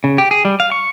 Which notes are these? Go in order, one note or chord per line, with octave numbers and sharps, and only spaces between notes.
C#3
G4
G#4
G3
F5
C#6